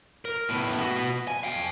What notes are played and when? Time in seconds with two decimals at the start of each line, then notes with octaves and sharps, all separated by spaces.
0.25 A#4
0.49 A2 B3
0.80 B3 F#4
1.28 G#5
1.43 F5 G5